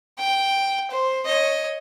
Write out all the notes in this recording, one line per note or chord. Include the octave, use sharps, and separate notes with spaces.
G5
C5
C#5 D#5